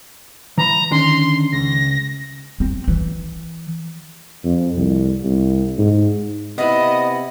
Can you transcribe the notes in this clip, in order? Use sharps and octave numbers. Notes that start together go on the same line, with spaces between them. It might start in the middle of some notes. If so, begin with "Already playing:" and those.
E3 A#5 B5
D3 D#3 C#4 C6
C#2 A#6
C4
E3
F2
C2
C2
G#2
C3 B3 E4 D#5